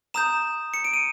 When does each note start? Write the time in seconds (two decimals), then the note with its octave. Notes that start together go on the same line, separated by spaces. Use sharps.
0.14 A#5 D#6 G6 E7
0.74 C#7
0.84 D7
0.94 D#7